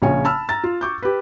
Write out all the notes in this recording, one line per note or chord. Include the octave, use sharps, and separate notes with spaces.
A#1 C#3 C#5 G#5
A5 B5 E6 F6
A#5 A6
F4
C#6 D6 G6
G4 B4